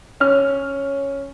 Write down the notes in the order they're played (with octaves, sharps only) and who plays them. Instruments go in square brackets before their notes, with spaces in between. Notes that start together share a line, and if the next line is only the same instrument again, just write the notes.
[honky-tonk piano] C#4 F6